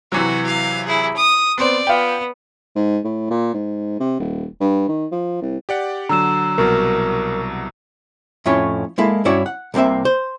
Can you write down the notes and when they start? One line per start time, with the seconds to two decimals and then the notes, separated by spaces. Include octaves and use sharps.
0.12 C3 E3 F#3 F#4
0.46 F5
0.86 E4 G#4
1.16 D#6
1.58 B3 C4 C5 D5
1.87 B3 F4 G5
2.76 G#2
3.04 A2
3.30 A#2
3.54 G#2
4.00 C3
4.20 D#1
4.60 G2
4.88 D#3
5.12 F3
5.41 C2
5.69 G4 D5 F#5
6.09 D3 F#3 A#5 E6 E7
6.58 C2 B2 F#3 A#4
8.46 F2 A2 C#4 E4 F4 C#5
8.98 G#3 A#3 E4 A4
9.25 G2 C#4 E4 F#4 C#5 D5
9.46 F#5
9.74 C2 C3 A#3 C4 E5
10.05 C5